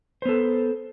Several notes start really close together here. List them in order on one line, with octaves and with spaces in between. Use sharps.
C5 B3 A4